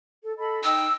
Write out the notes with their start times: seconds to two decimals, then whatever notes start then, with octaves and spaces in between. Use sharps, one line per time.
0.23 A4
0.37 A4 D#5 B5
0.64 D#4 G5 E6